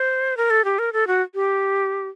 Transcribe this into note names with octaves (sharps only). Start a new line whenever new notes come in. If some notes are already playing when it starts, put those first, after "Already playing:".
Already playing: C5
A#4
A4
G4
A#4
A4
F#4
G4